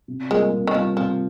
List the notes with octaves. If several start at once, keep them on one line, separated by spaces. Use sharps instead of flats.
C3
G3 G#3 A#3 F4
C3
D#3
F3 G3 A#3 F4
C3 F3